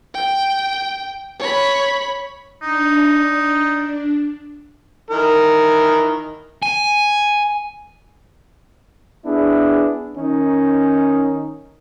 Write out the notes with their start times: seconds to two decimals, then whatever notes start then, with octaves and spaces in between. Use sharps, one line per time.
0.14 G5
1.39 C#5 B5
2.62 D4 D#4
5.10 D#3 E3 A#4
6.63 G#5
9.25 B3 D4 E4 G#4
10.17 D#3 C#4 D#4